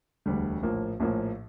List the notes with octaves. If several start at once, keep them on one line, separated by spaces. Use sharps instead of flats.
E1 D2 D3 G3
A#1 A2 F3 A#3
A#1 A2 F3 A#3